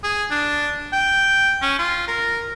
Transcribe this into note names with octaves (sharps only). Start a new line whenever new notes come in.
G#4
D4
G5
C#4
F4
A#4